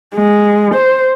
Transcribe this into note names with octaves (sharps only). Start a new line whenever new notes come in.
G#3
C5